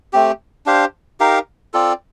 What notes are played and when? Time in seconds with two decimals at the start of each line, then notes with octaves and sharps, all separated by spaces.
0.13 A3 C4 G4
0.66 D4 G4 C5 F5
1.20 D#4 G4 A#4 F5
1.74 C4 F4 A4 D5